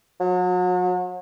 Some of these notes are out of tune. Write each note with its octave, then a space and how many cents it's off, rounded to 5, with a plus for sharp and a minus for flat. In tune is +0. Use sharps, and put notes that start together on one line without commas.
F#3 -35